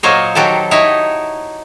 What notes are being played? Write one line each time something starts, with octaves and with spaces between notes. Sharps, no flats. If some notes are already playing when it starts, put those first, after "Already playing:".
A#2 F#3 A#3 C5 C#5 D#5
D#3 F#3 F#4 G4 A4
D#4 E4 C#5